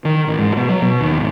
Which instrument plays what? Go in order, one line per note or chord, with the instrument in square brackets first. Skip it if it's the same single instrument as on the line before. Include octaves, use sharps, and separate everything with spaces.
[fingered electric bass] D#3
A1
G#2
B2
F#3
B2
D#2
G#1